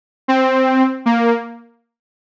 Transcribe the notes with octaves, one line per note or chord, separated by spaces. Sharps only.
C4
A#3